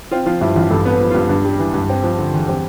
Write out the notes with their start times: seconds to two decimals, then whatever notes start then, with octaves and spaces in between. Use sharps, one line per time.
0.12 C4 F4
0.26 F3 F4
0.41 G2 E4
0.56 A1 F4
0.71 G2 A4
0.85 B3
0.91 B4
1.01 F3
1.10 F4
1.15 G2
1.29 G2 D4
1.45 G3
1.59 E3
1.74 G2
1.89 C4
2.04 F3
2.19 D3
2.33 E2
2.48 G3 C4